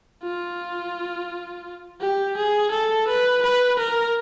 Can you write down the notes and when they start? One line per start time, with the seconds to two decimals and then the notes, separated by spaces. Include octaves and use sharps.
0.23 F4
2.00 G4
2.36 G#4
2.71 A4
3.07 B4
3.42 B4
3.78 A#4